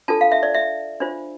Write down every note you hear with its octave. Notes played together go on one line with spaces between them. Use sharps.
D4 F4 A4 A5
F5
E5
D5
E5
D4 F4 C5